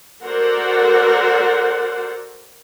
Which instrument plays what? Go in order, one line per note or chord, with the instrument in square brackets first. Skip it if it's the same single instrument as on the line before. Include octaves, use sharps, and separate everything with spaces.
[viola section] F#4 A4 A#4 C5 D5 F#5